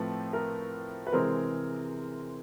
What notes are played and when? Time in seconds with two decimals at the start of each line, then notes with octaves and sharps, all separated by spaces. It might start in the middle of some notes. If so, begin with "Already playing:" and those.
Already playing: A2 F3 A3 C4 B4
0.33 A#4
1.07 B4
1.12 C3 E3 G#3 C4 A#4